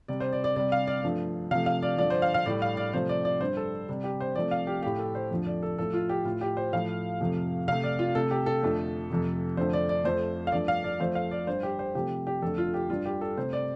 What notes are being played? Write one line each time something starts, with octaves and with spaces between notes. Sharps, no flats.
C3 G3 D5
C5
D5
D5
C3 G3 D5
F5
D5
G2 F3 A3
C3 F3 A3 F5
F5
D5
G2 D3 F3 D5
C5
F5
F5
A2 G3 D5
F5
D5
C3 F3 A3 C5
D5
D5
G2 G3 C5
A4
C3 G3
G4
C5
C3 F3 A3 D5
F5
G4
A2 A3 G4
A4
C5
F2 D3 F3 A3
D5
A4
A2 F3 A3 A4
F4
G4
A2 A3 F4
G4
C5
A2 F3 A3 F5
F2 C3 F3 A3
C3 A3 F5
D5
F4
C3 A3 A4
G4
A4
F2 D3 F3 A3
F2 C3 F3 A3
F2 D3 F3 A3 C5
D5
D5
F2 F3 A3 C5
F5
G2 F3 A3 D5
F5
D5
F2 F3 A3 C5
F5
D5
G2 G3 C5
G4
C5
C3 F3 A3 G4
G4
F2 D3 A3 A4
F4
G4
G2 G3 F4
G4
A4
C3 A3 C5
D5